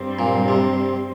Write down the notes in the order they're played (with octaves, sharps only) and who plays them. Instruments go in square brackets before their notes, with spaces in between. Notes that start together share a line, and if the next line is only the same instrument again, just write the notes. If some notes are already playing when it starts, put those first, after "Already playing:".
Already playing: [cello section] G2 G3 C4
[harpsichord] A#2
C3